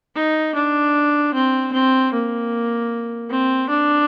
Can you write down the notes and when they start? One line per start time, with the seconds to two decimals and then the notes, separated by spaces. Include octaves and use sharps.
0.15 D#4
0.55 D4
1.34 C4
1.73 C4
2.13 A#3
3.30 C4
3.69 D4